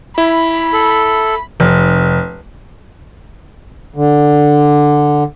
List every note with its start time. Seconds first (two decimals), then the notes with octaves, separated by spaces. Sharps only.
0.18 E4 B5
0.73 A4
1.60 F1
3.96 D3